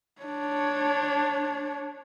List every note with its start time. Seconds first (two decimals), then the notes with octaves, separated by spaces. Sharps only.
0.22 D4 C#5